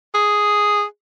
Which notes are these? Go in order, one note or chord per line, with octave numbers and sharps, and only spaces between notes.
G#4